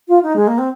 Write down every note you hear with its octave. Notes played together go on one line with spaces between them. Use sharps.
F4
D#4
G#3
A#3
C4